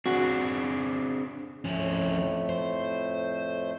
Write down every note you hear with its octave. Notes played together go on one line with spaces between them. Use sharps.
C4 D4 F#4 G#4
F2 A2 F3 A3 C#4
C5